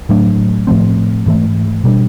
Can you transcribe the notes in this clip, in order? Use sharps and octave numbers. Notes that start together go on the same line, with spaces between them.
A2 F#3 A3 D4
A2 F3 A3 C4
G#2 E3 A3
B2 G3 A#3 D4